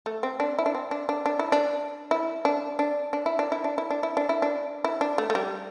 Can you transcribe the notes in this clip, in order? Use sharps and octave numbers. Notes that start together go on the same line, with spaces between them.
A3
C4
D4
E4
D4
C4
D4
D4
D4
E4
D4
E4
D4
D4
D4
E4
D4
E4
D4
E4
D4
E4
D4
E4
D4
E4
D4
A3
A3
G3